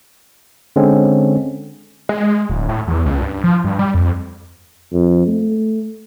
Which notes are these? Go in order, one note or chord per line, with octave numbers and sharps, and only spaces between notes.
D3 G#3 C4 C#4
G#3
G#3
D1
A2
E2
C#2
G2
F3
G2
G3
F2
F2
A3